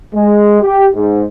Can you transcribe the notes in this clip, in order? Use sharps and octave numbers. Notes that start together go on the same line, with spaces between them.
G#3
G4
G#2